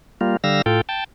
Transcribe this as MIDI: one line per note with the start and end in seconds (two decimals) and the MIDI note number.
0.21 0.37 55
0.21 0.37 58
0.21 0.37 65
0.44 0.62 50
0.44 0.62 55
0.44 0.62 77
0.44 0.62 88
0.44 0.62 94
0.66 0.81 45
0.66 0.81 65
0.66 0.81 69
0.66 0.81 79
0.89 1.04 79
0.89 1.04 81